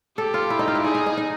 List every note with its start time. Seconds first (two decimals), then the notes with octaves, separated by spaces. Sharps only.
0.17 G4 A4
0.34 F4
0.50 E4
0.59 D#4
0.68 F4
0.75 E4
0.83 D#4 G#4
0.95 D#4
1.06 D#4
1.17 D#4